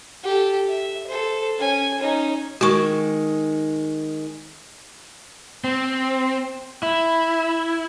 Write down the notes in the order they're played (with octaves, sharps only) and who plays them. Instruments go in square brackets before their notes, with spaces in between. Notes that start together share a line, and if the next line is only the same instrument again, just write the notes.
[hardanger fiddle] G4 A4
E5
A4 C5
C#4 G#5
C#4 D#4
[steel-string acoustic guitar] D#3 G#3 [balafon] F#4 C#6
[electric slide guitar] C4
E4